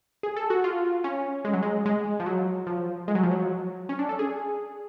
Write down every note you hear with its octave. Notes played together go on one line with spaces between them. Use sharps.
G#4
A4
F#4
F4
C#4
G#3
F#3
G#3
G#3
F3
F#3
F3
G#3
F#3
F3
F#3
C#4
D4
A4
G#4